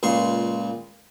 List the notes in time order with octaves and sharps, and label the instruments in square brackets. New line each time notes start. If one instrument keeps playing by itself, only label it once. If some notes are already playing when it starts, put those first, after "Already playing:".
[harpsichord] C#2 A#2 C6 C#6